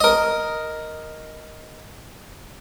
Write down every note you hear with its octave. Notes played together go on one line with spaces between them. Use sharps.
A#4 D#5